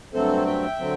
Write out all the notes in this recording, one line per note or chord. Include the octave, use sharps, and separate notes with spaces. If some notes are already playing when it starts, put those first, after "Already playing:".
G2 F#3 A3 C4 A4 C5
E5 G5
D3 F#3 C4